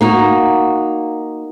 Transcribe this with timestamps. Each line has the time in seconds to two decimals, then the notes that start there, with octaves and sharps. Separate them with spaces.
0.01 A#3 D#4 F#4